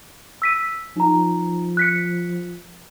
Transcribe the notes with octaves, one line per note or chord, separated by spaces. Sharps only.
E6 B6 D#7
F3 D#4 A#5
F#6 B6 C#7